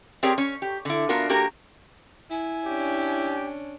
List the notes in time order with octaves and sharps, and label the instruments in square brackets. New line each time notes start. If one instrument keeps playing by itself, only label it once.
[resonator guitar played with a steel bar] C4 G4 G#4 A#4 C#5 D5
C#4 C#5
G4
D3 E4
B3 D4 F4 F#4 A#4
A#3 F#4 G4 A#4
[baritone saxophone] E4 [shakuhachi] G#5
[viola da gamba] C#4 D4 [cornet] G4